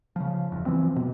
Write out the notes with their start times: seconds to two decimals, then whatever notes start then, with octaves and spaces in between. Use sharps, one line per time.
0.16 C#3 F3
0.52 F#1 E2
0.66 E3 F3 C4
0.96 B2